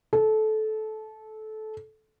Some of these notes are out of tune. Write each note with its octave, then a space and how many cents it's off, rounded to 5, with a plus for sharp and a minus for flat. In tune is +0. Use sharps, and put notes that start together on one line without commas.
A4 -20